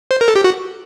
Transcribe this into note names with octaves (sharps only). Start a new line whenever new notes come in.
C5
A#4
A4
G4
F#4